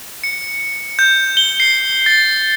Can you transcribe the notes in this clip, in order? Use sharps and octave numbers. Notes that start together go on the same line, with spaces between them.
C#7
G6
G7
C7
A6